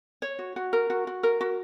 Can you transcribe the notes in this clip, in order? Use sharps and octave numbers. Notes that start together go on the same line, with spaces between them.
C#5
F#4
F#4
A#4
F#4
F#4
A#4
F#4